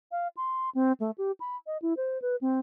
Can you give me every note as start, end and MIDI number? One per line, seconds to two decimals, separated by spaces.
0.12 0.28 77
0.37 0.70 84
0.75 0.92 60
1.00 1.11 57
1.18 1.32 67
1.40 1.56 83
1.67 1.77 75
1.82 1.94 64
1.97 2.21 72
2.22 2.36 71
2.41 2.59 60